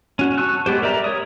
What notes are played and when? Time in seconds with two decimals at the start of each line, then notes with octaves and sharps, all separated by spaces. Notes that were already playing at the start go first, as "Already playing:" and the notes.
0.19 C#4 F#4
0.38 A5 C#6 E6 F#6
0.66 G#3 B3 G4 C5
0.82 A#4 D5 E5 A#5
1.04 C#5 D#6